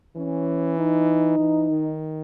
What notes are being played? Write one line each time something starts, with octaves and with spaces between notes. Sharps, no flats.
E3 C#4
D#4
E3
D#3